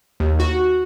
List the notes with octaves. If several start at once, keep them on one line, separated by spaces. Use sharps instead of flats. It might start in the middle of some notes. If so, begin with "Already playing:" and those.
D#2
F#4